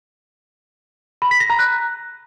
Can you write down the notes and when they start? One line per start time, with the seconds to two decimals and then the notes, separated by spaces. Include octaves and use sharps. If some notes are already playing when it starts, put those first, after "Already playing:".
1.22 B5
1.31 B6
1.40 A#6
1.50 A#5
1.59 F#6